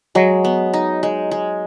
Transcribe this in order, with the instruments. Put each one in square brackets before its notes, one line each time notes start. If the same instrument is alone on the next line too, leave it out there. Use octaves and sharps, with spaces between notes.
[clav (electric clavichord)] F#3 [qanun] G#3
[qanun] B3
D#4
G#3
G#3